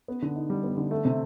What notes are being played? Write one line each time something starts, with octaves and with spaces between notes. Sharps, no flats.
B3
D3
D#4
G3
B3
D3
A3
C3